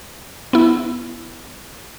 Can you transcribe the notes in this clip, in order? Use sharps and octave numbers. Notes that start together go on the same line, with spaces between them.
B3 E4